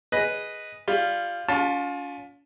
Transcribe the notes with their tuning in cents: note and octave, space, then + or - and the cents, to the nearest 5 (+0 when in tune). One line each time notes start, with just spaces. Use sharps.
G#4 +0 B4 +0 D#5 +0
G3 +20 F4 -5
C#4 +40 F4 +30 A5 +0